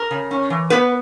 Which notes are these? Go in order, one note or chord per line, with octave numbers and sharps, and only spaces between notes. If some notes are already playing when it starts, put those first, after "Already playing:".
Already playing: A#4
C#3
C#4
E3
B3 B4